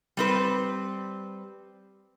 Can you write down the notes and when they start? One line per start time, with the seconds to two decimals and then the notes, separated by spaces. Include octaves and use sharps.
0.17 G3 C4 B4